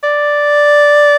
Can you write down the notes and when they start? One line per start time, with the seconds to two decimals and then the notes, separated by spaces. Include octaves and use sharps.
0.03 D5